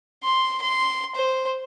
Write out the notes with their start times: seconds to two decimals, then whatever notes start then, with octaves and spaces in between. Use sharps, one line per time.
0.23 C6
0.62 C6
1.15 C5